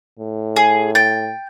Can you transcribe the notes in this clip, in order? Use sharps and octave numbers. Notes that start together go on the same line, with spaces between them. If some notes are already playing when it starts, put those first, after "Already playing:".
A2
G#4
G5 A6